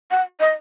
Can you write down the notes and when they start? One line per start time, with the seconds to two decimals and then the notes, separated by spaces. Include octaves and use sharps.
0.11 F#5
0.40 D#5